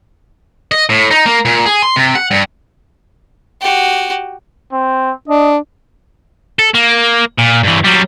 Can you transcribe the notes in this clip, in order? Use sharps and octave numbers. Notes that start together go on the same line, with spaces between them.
D#5
A2
D#4
A#3
A#2
G#4
C6
C3
F#5
G2
F#4 G4
C4
D4 D#5
A4
A#3
A#2
G2 E3
F#3 G3